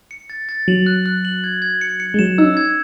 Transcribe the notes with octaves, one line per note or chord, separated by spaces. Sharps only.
C#7
A6
A6
F#3 F#7
F#6
F#6
F#7
G#6
G#6
C#7
C#7
G#3
F#3 E7
D#4 E6
C#4
G#6